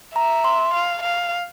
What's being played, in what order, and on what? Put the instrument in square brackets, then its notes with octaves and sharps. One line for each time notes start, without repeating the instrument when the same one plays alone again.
[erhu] E5 [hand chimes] A#5
[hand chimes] C6
[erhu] F5
F5